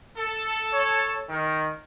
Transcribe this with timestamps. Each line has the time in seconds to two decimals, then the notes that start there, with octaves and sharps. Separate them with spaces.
0.17 A4
0.73 C#5
1.29 D#3